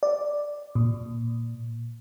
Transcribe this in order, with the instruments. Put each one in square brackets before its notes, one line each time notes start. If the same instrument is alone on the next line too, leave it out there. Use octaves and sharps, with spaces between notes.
[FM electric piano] D5
A#2